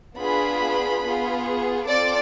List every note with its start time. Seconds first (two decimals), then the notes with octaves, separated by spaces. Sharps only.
0.19 B3 D4 F4 G#4 B4 B5
1.04 B3 F4 G#4
1.89 C4 F4 A4 D5 D6